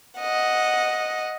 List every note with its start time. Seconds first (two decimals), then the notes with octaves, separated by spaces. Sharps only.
0.19 D#5 F#5